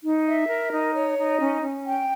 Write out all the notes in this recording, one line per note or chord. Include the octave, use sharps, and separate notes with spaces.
D#4
E5
A#4
D#4
C#5
D#4
C#4
C#4
G5